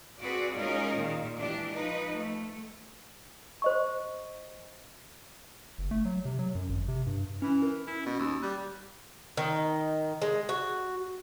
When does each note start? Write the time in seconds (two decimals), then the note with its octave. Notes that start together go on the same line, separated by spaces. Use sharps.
0.21 C4 F#4 G#4 B4 D5
0.56 G#3 C#4 D#4 F4 G#4 A#4
0.95 A#2 D#3
1.39 E3 G#3 D4 G4
1.74 F3 D#4 B4
2.14 A3
3.62 C5 D#5 C#6
5.78 F#1
5.91 A3
6.05 F#3
6.25 C3
6.39 F#3
6.55 F#2
6.69 G#1
6.88 C3
7.06 G2
7.42 E3 C#4
7.62 A#4
7.87 C#4 E4
8.06 B2
8.19 D#2
8.42 G3 F#6
9.37 D#3
10.22 G#3
10.49 F#4